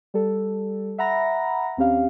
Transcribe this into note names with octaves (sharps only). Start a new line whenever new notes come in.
G3 A4
E5 F#5 A#5 B5 A#6
D#2 C4 C#4 G4 F5